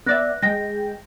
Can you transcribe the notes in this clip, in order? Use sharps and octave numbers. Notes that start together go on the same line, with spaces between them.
B3 D5 E5 F#6 A#6
G#3 G5 A#6